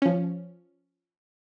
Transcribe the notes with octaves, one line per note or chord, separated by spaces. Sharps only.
F3 C#4